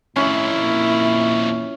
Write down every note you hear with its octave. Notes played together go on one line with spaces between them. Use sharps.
F2 A2 D#3 C#4 E4
A#2